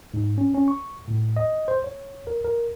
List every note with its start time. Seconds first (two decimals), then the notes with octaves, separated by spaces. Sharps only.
0.14 G#2
0.38 C#4
0.54 C#4
0.68 C#6
1.08 A2
1.36 D#5
1.68 C5
1.84 C#5
2.27 A#4
2.45 A#4